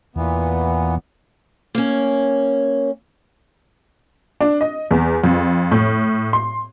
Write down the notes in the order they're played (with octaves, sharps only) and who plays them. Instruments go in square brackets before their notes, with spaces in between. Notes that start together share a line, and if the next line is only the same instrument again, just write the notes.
[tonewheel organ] E2 [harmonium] A#2 E3 B3
[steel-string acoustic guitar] A#3 C#4
[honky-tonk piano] D4
D#5
E2
F2
A2
C6